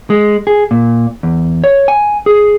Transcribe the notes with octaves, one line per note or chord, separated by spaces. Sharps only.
G#3
G#4
A#2
E2
C#5
G#5
G#4